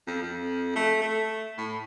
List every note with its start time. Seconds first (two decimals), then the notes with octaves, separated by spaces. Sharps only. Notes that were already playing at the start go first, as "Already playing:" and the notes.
0.07 F2
0.23 F2
0.76 A3
1.02 A3
1.58 A2